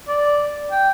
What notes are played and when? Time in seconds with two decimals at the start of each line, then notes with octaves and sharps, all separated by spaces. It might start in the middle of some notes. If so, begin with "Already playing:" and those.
0.08 D5
0.71 G5